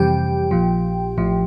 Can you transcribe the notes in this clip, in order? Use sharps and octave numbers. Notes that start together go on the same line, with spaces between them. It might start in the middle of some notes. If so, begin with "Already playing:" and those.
Already playing: F2 C3 E3 G3 G4 G5
A#1 A#2 F3
A1 A2 F3